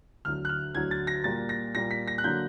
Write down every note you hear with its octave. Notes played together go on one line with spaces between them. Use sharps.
D2 D3 F#3 F6
F#6
F6
D2 D3 F#3 G#6
A6
A#6
A#2 G3 A#3 A6
A#6
A#2 G3 A#3 A#6
B6
A#6
F#6
D3 F#3 A#3 G6